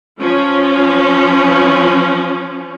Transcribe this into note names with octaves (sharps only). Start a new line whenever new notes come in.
F3 C#4